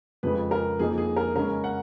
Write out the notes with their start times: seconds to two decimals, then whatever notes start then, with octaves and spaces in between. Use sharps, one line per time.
0.23 F2 C#3 G#3 B4
0.51 A#4
0.79 F2 F3 A#3 D#4 G#4
0.98 G#4
1.16 A#4
1.36 C#3 G#3 C#4 A#4
1.64 F#5